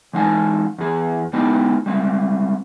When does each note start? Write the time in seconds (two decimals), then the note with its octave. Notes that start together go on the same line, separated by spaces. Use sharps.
0.13 E3 G#3 D#4 F5 G#5 A5
0.78 E2 G#4
1.33 G#3 B3 D#4 E4 G4
1.86 G3 G#3 C4